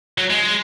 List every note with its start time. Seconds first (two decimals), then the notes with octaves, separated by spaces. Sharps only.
0.18 F#3
0.30 G#3